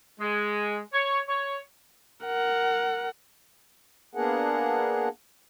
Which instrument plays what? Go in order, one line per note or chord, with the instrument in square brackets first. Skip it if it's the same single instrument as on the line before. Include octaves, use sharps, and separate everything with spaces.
[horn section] G#3
C#5
C#5
[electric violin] A#4 F#5
[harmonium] A#3 B3 D4 G#4 A#4 F#5